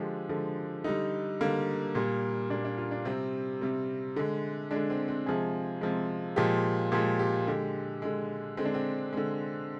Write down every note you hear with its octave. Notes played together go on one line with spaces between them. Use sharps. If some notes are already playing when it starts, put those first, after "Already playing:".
Already playing: D3 F3 G#3 G4
D3 F3 G#3
D3 G3 D#4
D3 G3 A#3
A#2 G3
A#2 G3 D4
D4
F4
D4
C3 G3 C4
C3 G3
D3 G#3
G#3 D4
D3
C4
C4
C3 F3 G#3 G#4
C3 F3 G#3
A#2 F3 G#3 G4
A#2 F3 G#3 G4
G4
D3 G#3 G4
D3 G#3
D3 G#3 C4
D4
C4
D3 G#3